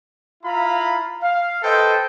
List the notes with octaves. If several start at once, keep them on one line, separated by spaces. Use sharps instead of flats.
E4 F4 F5 A#5 B5
F5
A4 B4 C5 D#5 G5